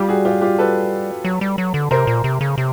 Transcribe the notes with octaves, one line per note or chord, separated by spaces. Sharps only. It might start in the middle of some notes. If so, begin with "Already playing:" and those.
Already playing: G3 F4 G4
F#4 G#4
F4 G4
F4 G4
A4 B4
F#3
G3
F#3
D3
C3 A#4 C5
A#2
C3
C#3
C3